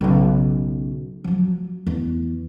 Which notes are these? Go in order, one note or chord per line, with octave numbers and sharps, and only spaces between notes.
B1 C#3
F3 F#3
E2